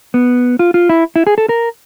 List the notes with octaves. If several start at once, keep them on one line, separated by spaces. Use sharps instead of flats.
B3
F4
F4
E4
E4
G#4
A4
A#4